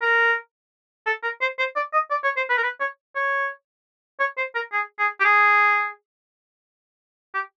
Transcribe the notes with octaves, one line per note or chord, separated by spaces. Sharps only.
A#4
A4
A#4
C5
C5
D5
D#5
D5
C#5
C5
B4
A#4
B4
C#5
C#5
C#5
C5
A#4
G#4
G#4
G4
G#4
G4